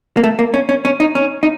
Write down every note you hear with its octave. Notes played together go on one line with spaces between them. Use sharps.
A#3
A3
A#3
C#4
C#4
C#4
D#4
C#4
D#4